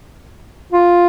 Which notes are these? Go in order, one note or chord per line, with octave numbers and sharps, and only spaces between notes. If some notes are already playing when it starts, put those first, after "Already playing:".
F4